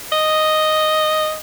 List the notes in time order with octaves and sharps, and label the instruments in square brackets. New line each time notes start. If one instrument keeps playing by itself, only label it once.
[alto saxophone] D#5